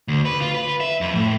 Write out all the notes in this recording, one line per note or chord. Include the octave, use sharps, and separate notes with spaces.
D2
B4
F4
B4
E5
F2
A2